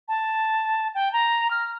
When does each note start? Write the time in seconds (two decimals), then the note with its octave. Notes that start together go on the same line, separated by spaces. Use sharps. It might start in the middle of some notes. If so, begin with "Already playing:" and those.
0.08 A5
0.95 G5
1.13 A#5
1.51 F6